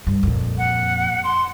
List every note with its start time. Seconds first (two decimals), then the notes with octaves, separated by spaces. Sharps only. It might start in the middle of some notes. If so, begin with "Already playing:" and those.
0.07 G2
0.23 F2 A#2
0.58 F#5
1.24 C6